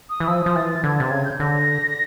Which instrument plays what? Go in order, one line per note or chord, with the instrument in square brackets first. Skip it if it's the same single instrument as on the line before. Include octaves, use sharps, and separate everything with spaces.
[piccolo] D#6
[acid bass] E3
[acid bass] F3 [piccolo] E6
[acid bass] F3 [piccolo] D#6
[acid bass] E3 [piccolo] A6
[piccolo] A6
[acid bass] D3 [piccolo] G#6
[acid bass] C3 [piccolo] A6
[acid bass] C#3 [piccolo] G#6
[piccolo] G6
[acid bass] D3 [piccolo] A#6